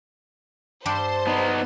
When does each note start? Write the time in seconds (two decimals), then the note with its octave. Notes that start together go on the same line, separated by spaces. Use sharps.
0.86 G2 G3 C5 A5 C6
1.27 B3 D#4